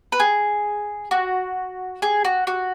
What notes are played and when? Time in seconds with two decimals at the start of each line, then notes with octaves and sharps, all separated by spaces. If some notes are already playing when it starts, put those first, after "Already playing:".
0.12 B4
0.20 G#4
1.11 F#4
2.02 G#4
2.25 F#4
2.47 F#4